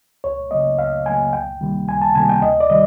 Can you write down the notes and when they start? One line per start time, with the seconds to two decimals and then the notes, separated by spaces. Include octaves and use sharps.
0.24 C#2 C#5
0.51 C#3 F#3 A#3 D#5
0.79 C#2 F5
1.06 C#3 F#3 A#3 G#5
1.33 C#2 G5
1.61 C3 D#3 G3 A#3
1.88 C#2 G#5
2.02 A5
2.15 C3 D#3 G3 A#3 G#5
2.29 G5
2.42 D2 D#5
2.60 D5
2.70 C3 D#3 G3 D#5